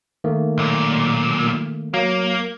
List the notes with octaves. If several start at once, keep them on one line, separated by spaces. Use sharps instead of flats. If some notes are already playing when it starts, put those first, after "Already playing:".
D#3 A3 A#3
B1 A#2
F#3 A#3 F5